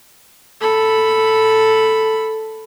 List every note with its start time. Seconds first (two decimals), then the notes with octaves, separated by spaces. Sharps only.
0.61 A4 B5